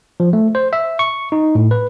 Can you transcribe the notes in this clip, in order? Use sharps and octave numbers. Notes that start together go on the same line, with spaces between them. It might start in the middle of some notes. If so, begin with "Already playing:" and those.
F3
A3
C5
E5
C#6
D#4
A2
B4